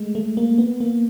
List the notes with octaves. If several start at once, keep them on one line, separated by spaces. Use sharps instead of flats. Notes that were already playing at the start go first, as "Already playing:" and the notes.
Already playing: G#3 A3
A3
A#3
B3
A#3